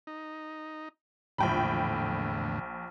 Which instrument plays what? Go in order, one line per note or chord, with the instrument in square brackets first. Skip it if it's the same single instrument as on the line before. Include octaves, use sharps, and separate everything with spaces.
[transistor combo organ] D#4
[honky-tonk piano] A#1 G5 B5 [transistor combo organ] E2 A2 D3